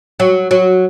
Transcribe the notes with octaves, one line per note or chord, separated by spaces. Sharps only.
F#3
F#3